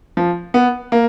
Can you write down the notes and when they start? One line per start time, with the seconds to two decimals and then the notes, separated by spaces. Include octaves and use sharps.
0.17 F3
0.54 B3
0.92 A#3